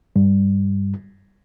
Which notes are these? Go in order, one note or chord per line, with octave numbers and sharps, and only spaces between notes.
G2